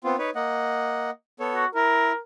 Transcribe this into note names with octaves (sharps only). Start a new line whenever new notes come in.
B3 C4 F4
D#4 B4 C#5
A#3 D#5 F#5
B3 A4 C#5
F#4
E4 A#4